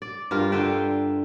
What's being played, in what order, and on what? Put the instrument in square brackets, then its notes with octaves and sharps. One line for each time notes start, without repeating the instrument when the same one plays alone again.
[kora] D5
G2 F4 A#4
D3 F4 E5 G5